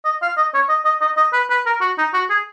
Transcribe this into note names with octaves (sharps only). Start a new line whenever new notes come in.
D#5
F5
D#5
C#5
D#5
D#5
D#5
D#5
B4
B4
A#4
F#4
D#4
F#4
G#4